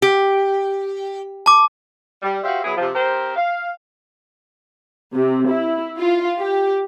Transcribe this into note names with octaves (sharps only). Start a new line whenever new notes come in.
G4
A5 D6
G3
F#4 G4 C5 E5 F5
F#3 B3 E4 G#4
C3 F3
C4 G4 A#4 C5
F5
C3
E4
F4
G4